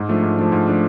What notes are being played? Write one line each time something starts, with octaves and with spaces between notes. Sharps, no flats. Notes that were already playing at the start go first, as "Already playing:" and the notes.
Already playing: G#2
F3 A3 D4
G#2
F3 A3 D4
G#2
F3 A3 D4